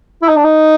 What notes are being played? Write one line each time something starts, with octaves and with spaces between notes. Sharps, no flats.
E4
D#4
D4
D#4